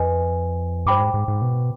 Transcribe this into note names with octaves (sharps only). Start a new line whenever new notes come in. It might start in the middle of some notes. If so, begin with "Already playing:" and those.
Already playing: F2 B4 D#5 G#5
G2 C5 G5 B5 D6
G#2
G#2
G#2
B2